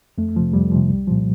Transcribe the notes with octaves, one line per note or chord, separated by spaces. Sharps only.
F2 A3
C3 F3
F2 G3
C3 F3
C2
A#2 F3